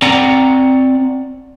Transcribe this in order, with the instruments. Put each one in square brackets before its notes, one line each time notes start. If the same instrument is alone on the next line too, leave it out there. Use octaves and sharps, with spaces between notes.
[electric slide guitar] C4 D5 F#5 A#5